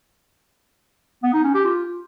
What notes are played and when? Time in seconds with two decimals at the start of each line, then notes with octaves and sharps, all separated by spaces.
1.23 B3
1.34 D#4
1.44 C#4
1.54 G4
1.65 F4